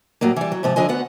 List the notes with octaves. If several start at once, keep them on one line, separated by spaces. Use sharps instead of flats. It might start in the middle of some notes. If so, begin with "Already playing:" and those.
A2 F#3 G3 A#3
E3 G3
F#3
G#2 C3 F3
D3 F3 D#5 G#5
D2 B3 F#5